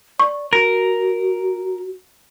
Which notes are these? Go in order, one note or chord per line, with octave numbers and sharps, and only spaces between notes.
D5 C#6
F#4 A#4